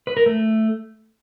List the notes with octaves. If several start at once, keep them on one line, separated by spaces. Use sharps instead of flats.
B4
A#4
A3